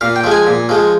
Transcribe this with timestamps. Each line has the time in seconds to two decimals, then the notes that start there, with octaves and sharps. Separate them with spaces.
0.01 A#2 F5
0.16 G5
0.24 F3 G#3
0.31 G#5
0.47 A#2
0.69 F3 G#3